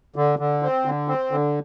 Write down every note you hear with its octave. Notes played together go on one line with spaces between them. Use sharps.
D3
D3
C4
D3
C4
D3